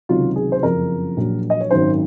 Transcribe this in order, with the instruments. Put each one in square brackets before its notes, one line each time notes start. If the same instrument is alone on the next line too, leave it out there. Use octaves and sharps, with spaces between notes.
[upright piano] C#2 C3 D#3 F#3 F4
G#4
C5
F#1 F2 C#3 F3 A#4
A#1 A#2 F#3
D#5
C#5
G#1 F#2 D#3 F#3 C5